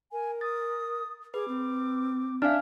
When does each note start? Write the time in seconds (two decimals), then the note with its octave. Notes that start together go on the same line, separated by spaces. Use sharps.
0.12 A#4 G#5
0.41 D#6 A6
1.34 G#4 B4 D6
1.48 C4
2.42 D4 E5 F5 G#5 F6